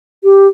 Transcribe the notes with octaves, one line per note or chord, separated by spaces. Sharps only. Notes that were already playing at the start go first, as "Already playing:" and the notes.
G4